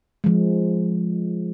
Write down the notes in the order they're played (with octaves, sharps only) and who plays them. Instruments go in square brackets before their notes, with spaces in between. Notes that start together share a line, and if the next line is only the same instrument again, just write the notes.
[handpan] F3 G#3